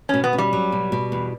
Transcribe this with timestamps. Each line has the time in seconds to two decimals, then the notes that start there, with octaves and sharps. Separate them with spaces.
0.09 B2 C#4
0.24 B3
0.33 C#4
0.38 G3
0.53 F#3
0.72 B2
0.92 B2
1.12 E2